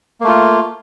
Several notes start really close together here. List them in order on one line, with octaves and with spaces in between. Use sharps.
A#3 A3 F4